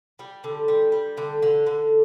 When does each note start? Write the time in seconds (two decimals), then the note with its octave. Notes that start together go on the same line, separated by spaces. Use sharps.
0.19 G3
0.44 D3
0.68 G3
0.92 G3
1.17 D3
1.42 D3
1.66 D3